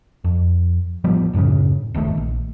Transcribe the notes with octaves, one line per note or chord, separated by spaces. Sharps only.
F2
A1 F3 G3 B3
D1 F#2 A2 C#3
D1 G1 D#3 A3
A#1